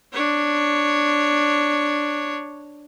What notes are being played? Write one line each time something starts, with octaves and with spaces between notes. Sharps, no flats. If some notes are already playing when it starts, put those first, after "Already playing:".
D4 C#5